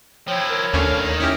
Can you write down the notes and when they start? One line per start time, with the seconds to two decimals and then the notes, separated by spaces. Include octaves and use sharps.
0.28 F3 E4 C#5 G5
0.50 A#4 C#5
0.74 D#2 B2 A3 C#4 D4 F5
0.99 D#3
1.20 C#4 E4 G4 F6